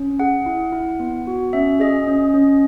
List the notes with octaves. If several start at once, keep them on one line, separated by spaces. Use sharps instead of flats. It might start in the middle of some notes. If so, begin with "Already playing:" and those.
Already playing: C#4
G#4 F#5
E4
E4
B3
F#4
C#4 E5
G#4 D#5
C#4
C#4